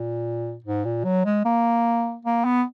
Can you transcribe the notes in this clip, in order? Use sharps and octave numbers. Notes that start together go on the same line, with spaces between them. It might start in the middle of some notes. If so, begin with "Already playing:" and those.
Already playing: A#2
G#2
A#2
F#3
G#3
A#3
A#3
B3